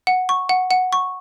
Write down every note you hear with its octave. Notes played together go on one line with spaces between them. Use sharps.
F#5
C#6
F#5
F#5
C#6